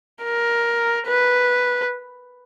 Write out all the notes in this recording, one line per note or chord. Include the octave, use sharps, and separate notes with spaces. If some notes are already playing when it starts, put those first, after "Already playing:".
A#4
B4